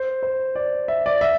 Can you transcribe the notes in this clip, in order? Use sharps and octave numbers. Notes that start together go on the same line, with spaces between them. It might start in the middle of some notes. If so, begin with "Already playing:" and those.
Already playing: C5
C5
D5
E5
D5
E5